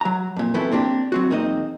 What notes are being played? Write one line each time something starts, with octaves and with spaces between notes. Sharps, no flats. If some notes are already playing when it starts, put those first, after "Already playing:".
F#3 A#5
F2 A#2
E3 F#3 B3 C4 E4 A4
A#3 C4 D4 G4
F#3 C4 F#4
B1 E2 A#3 C4 D#4 D#5